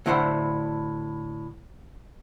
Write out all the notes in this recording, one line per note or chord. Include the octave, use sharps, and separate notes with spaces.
A2 D3 E4 C5 D5 F#5